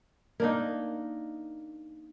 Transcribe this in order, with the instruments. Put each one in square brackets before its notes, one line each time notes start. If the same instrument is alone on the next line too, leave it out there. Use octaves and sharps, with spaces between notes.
[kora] A#3 D4 D#4